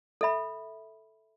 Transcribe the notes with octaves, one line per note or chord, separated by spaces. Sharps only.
A4 E5 B5